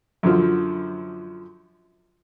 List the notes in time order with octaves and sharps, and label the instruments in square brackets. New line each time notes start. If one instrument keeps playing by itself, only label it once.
[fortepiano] F#2 D3 F3